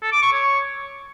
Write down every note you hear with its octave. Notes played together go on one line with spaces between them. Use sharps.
A4
D6
C#6
C#5